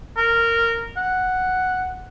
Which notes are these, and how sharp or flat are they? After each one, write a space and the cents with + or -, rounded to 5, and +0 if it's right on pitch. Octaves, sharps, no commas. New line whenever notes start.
A#4 -15
F#5 +0